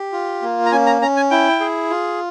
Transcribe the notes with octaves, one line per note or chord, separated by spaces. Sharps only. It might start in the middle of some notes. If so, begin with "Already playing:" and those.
Already playing: G4
F4
A#3
A#5
C#4 G#5
A#5
C#4 A#5
G#5
E4 G5
G#4
F4